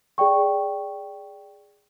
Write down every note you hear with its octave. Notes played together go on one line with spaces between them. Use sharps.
G#4 D5 G5 C#6